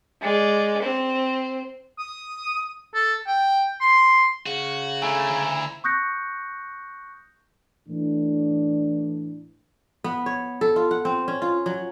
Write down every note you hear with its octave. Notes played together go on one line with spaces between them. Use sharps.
G#3 D5
C4
D#6
A4
G5
C6
C#3 F#4
D3 A3 E4 G#5 A#5 E6
D2
C#6 D#6 F#6 G6 A#6 C#7
A2 E3 D4
B3
C#5
A4
F4
F#5
C4
C#4
F4
F#3